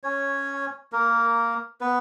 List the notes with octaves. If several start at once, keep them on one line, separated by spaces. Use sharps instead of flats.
C#4 C#5
A#3 A#4
B3 B4